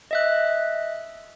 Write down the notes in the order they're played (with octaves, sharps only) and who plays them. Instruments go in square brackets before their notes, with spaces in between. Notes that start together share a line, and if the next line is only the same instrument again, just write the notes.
[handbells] D#5 E5 F#6